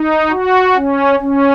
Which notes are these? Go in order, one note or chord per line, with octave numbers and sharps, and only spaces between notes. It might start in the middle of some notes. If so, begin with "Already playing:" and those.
Already playing: D#4
F#4
C#4
C#4